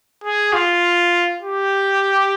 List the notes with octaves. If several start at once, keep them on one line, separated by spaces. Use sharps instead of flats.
G#4
F4
G4